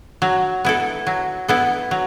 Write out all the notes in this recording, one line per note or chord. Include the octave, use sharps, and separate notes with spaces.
F#3
B3 E4 A4
F#3
B3 E4 A4
F#3